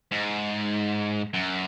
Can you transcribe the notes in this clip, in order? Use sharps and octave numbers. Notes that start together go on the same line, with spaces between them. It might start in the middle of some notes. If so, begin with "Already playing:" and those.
G#2
F#2